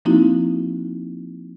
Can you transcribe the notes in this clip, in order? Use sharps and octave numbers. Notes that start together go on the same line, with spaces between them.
F3 A#3 C4 D#4 E4 F#4